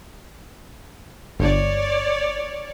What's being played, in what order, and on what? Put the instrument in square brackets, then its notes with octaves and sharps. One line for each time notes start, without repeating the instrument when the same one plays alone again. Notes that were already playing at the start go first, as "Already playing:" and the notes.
[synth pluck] G1 [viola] C#5 D5